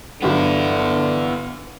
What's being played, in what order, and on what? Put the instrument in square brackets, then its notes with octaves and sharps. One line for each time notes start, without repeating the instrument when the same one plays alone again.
[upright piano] G1 F#3 [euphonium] D3 [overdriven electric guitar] B3 E4